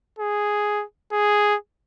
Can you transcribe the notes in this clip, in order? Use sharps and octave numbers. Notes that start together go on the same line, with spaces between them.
G#4
G#4